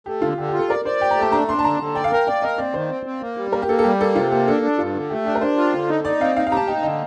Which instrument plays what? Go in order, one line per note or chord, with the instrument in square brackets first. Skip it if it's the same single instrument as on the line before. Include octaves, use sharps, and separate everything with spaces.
[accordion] A3 [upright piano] G4
[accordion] D3 [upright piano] F4
[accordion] D3 [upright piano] G4
[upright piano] G4
[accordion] F4
[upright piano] A4
[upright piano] A#4 [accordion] D5
[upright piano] C5 [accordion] D5
[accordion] G4 [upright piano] G5
[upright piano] A#5
[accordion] A3
[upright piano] A5
[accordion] D4 [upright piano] A#5
[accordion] D4 [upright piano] C6
[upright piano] A5
[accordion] D3 [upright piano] A#5
[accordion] D3
[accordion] D5 [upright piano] G5
[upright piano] F5
[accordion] A#4 [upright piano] G5
[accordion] D5 [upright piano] G5
[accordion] A#4 [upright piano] D#5
[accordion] C4 [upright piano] D5
[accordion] D#3 [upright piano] C5
[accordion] C4
C4
A#3
G3
[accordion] A#3 [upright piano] A#4
[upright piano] G4
[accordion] A#3 [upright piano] A4
[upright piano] A4
[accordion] G3 [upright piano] G4
[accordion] A#3 [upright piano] A4
[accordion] C3 [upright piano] F4
[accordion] A#3 [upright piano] G4
[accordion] D4 [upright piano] A4
[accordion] D4
[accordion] G2 [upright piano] F4
[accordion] D3
[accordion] A3 [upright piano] G4
[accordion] D4 [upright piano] G4
[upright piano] A#4
[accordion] D4 [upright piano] C5
[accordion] F4
D3
D#4
[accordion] D#4 [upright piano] D5
[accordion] C4 [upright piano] F5
[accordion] D#4 [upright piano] F5
[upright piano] F5
[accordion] G4 [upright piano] A#5
[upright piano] A5
[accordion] D#4 [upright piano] G5
[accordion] D3 [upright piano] D#5